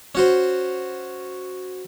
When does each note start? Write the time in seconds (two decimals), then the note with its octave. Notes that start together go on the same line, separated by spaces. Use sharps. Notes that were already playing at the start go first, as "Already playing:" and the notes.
0.15 C#4 F#4 C5